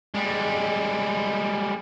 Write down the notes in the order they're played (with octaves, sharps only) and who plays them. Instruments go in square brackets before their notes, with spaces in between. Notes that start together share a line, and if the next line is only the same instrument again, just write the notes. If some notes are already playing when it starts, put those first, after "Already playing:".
[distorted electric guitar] G3 G#3